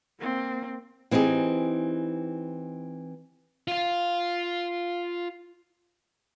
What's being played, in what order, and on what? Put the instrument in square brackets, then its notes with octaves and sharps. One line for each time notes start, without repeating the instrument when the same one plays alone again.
[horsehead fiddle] A#3 C4
[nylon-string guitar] E3 C4 D#4 G4 G#4
[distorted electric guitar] F4 F5